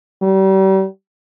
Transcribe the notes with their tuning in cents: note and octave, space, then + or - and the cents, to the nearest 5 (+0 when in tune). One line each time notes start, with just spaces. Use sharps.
G3 -35